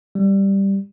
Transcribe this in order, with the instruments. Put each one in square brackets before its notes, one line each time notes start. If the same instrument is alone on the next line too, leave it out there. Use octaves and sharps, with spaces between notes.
[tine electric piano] G3